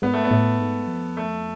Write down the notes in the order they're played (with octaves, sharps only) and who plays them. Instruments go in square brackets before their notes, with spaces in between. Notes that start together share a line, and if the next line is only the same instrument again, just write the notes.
[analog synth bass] G#2 [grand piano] B3
[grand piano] A3
B3
[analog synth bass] A2
G#2
F2
[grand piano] A3